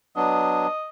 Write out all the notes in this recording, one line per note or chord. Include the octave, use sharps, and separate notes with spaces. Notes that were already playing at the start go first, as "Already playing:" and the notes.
F#3 B3 D4 D#5